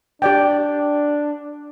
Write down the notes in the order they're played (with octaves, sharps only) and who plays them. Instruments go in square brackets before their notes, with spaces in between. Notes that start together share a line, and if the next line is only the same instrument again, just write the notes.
[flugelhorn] D4 [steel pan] G4 D5 G5